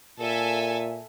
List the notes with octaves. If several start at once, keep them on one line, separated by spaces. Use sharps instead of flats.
A#2 A4 E5 G#5